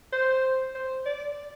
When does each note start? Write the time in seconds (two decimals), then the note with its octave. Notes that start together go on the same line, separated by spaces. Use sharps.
0.12 C5
0.75 C5
1.06 D5